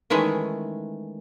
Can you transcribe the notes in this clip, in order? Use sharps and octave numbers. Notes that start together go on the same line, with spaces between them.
D#3 E3 G#3 A3 C#4